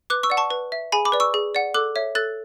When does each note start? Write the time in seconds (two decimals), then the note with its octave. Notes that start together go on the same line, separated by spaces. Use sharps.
0.10 B4 D6 F#6
0.23 C#6 E6
0.30 D5 F#5
0.37 A5 C#6
0.51 B4
0.72 E5
0.92 G#4 G#5 B5
1.05 B5 D6
1.12 B4 D5
1.20 C#6 E6
1.34 G#4
1.55 D5 F#5
1.74 A4 D6 F#6
1.96 C#5 E5
2.15 A4 F#6 A6